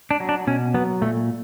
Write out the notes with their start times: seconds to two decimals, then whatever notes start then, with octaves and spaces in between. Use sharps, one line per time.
0.11 D4
0.20 F#3
0.29 D4
0.47 B2 C#4
0.74 F#3 B3
1.01 A#2 A3